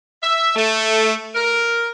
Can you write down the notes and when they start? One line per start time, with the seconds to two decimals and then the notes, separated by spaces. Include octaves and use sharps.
0.22 E5
0.56 A3
1.34 A#4